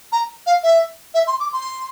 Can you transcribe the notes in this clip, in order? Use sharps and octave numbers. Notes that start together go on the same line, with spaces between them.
A#5
F5
E5
E5
C6
D6
C6